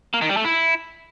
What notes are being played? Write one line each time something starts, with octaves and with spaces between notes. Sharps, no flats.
A#3
D#3
G3
A3
E4